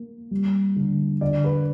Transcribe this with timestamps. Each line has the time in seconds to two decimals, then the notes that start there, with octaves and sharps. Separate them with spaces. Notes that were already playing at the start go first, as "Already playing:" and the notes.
Already playing: A#3
0.31 G3
0.76 D3
1.21 D3 D5
1.44 B4